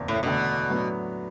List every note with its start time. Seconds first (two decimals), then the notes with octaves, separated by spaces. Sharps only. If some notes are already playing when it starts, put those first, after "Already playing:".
Already playing: F#1 E2
0.08 A2
0.23 E2 B2 D3 A3 D4
0.69 A2 F#3 B3 D4